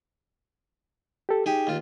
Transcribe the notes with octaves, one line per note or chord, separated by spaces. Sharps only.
G4 A4
D#4 G4 G#4
D#2 F4